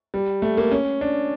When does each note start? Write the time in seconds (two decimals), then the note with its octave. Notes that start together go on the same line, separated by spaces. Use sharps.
0.14 G3
0.42 A3
0.57 A#3
0.71 C#4
1.01 D4